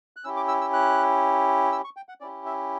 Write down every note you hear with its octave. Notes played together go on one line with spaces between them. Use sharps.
F#6
C#4 E4 G4 E6
D6
E6
E6
F#6
E6
C#6
G5
F#5
C#4 E4 G4 D5
E5